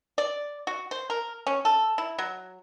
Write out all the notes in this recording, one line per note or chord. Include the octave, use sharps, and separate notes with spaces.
D5
F#4
C5
A#4
C#4
A4
E4
F#3